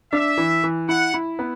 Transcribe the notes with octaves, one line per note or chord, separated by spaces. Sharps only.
D4 E5
E3
E3
E4 F#5
E4
B3